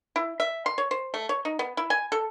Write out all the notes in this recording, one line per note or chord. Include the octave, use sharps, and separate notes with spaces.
E4
E5
C6
C#5
C5
A3
C#5
D#4
B3
E4
G#5
A4